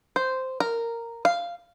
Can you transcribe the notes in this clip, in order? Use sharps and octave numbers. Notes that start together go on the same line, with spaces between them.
C5
A#4
F5